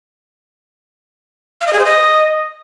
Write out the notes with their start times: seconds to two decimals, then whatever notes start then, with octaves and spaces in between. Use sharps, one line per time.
1.61 F5
1.67 D#5
1.73 G#4
1.79 C5
1.85 D#5